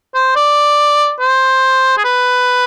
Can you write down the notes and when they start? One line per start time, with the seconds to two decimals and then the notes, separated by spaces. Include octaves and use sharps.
0.15 C5
0.36 D5
1.20 C5
1.98 G#4
2.04 B4